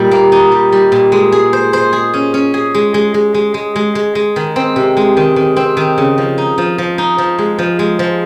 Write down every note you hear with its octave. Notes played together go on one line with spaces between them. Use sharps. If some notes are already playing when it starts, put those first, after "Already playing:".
Already playing: A#2 G3 D#4
A#3
D#4
G3
G3
A#2
G#3
G#4
C5
C5
G#4
C#4
C#4
G#4
G#3
G#3
G#3
G#3
G#3
G#3
G#3
G#3
D#3
C4
C3
G#3
D#3
D#3
C4
D#3
C#3
F3
D#4
F3
F3
D#4
F3
G#3
F3
G#3
F3